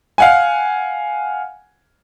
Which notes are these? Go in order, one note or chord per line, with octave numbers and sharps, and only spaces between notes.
F5 F#5 G#5